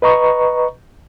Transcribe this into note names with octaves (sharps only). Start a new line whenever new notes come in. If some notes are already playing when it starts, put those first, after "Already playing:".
B4 D#5 A#5 C#6